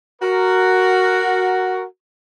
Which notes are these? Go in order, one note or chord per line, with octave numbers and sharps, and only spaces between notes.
F#4 A#4